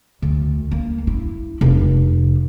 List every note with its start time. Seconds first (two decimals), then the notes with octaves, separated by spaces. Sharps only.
0.22 D2
0.71 A#3
1.07 E4
1.61 F1